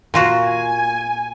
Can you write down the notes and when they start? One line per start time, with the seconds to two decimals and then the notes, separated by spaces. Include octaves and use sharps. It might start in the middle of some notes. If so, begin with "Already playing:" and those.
0.14 A#2 F4 F#4
0.45 G#5